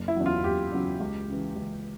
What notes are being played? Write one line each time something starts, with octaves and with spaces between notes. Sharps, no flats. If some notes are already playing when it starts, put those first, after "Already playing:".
Already playing: F#1
E4
E2 C#3 F#3
F4
F#1 G4
E2 C#3 F#3
C#2
C#3 E3
C#2